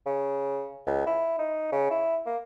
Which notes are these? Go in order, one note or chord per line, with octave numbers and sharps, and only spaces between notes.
C#3
C#2
E4
D#4
C#3
E4
A#3